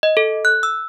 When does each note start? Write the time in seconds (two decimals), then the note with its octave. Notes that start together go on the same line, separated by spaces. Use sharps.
0.03 D#5
0.17 A4
0.45 F#6
0.63 E6